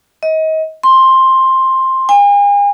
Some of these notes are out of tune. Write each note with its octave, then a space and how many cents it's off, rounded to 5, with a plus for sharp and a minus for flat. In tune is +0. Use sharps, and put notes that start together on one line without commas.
D#5 +30
C6 +10
G#5 -40